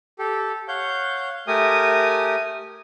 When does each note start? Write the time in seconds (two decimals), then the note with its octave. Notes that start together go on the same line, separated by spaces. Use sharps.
0.19 G4 A4
0.68 C#5 F5 F#5 G6
1.47 A3 G4 A#4 G#5 D#6